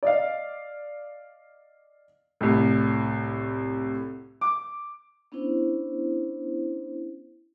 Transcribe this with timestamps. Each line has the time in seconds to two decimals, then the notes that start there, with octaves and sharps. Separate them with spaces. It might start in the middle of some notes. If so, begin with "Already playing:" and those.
0.03 D5 D#5 F5
2.41 C2 A2
4.41 D6
5.32 B3 C#4 D4 E4 C5